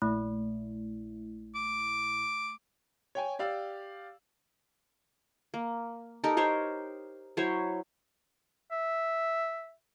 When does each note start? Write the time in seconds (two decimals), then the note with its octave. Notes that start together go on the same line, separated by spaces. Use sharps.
0.02 A#1 A#2 A3 E4
1.55 D6
3.15 C#5 G5 G#5
3.39 G4 D5 F5 E6
5.54 A#3
6.24 D#4 G4 A4 A#4
6.37 G4 A#4 C5 C#5
7.37 F#3 E4 C5 C#5
8.72 E5